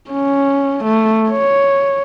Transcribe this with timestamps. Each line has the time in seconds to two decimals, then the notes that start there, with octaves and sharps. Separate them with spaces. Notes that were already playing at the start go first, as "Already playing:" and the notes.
0.10 C#4
0.84 A3
1.30 C#5